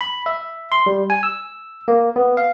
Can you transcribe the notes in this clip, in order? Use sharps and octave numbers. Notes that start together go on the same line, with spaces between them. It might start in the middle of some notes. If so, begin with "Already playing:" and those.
B5
E5
C6
G3
G#5
E6
A#3
B3
F5